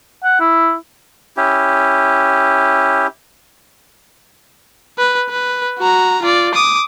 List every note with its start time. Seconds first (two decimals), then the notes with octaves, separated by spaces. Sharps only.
0.23 F#5
0.40 E4
1.37 C#4 E4 G4
4.98 B4
5.29 B4
5.79 F#4 A#5
6.22 F4 D5
6.54 D6 D#6